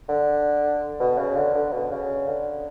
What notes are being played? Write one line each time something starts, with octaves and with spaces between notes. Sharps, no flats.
D3
B2
C#3
D3
D3
B2
C#3
D3